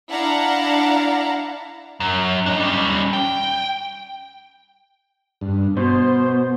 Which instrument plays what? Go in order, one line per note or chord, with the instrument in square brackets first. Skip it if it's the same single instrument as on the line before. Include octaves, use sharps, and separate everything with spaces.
[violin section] D4 E4 F5 F#5 A5 A#5
[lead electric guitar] F#2
D4 D#5
G3 C#4
G5
[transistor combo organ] G2
[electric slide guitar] B2 [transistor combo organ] C5